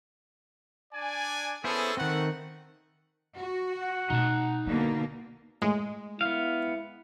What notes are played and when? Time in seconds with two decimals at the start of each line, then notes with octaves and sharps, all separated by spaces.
0.94 D4 D5 G#5
1.64 B3 C#4 E4 G#4 A4 C5
1.97 D#3 A3 C4 F#5
3.37 F#4
3.72 F#5
4.10 B2 A3 D#4 A5
4.66 B2 D3 G3 A#3
5.62 A2 G#3
6.21 B3 E4 F5